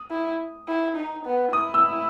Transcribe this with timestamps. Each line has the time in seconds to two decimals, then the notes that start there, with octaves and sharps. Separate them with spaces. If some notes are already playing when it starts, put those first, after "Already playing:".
Already playing: D#6
0.11 E4
0.68 E4
0.97 D#4
1.25 B3
1.53 E4 D#6
1.74 E6